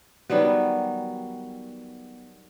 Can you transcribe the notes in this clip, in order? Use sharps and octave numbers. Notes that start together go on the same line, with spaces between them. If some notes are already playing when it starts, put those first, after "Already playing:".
D#3 F#3 G3 B3